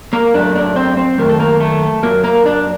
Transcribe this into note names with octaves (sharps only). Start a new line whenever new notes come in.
A#3 A#4
F#2 F#3 A3 D4 D5
D4 D5
C4 C5
C4 C5
F#2 D#3 A3 A#4
A4
A#3 A#4
A3 A4
F#2 F#3 A#3 A#4
A#3 A#4
D4 D5